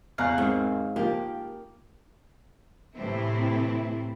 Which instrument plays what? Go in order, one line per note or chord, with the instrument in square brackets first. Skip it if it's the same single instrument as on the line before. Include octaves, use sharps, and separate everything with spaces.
[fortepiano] E2 A#5 F#6 [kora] C#4 F#5 [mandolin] F5
[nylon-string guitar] D#2 C4 [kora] G#2
[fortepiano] F3 [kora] A#3 [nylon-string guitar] G4
[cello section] A2 C3 E3 A3 C4 E4